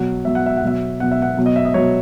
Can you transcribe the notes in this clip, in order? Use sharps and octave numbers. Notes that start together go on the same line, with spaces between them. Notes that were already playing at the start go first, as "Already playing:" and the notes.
Already playing: B2 F#3 F#5
B2 F#3 E5
F#5
E5
F#5
B2 F#3 E5
B2 F#3 F#5
E5
F#5
B2 F#3
D#5
E5
D#5
B2 F#3 C#5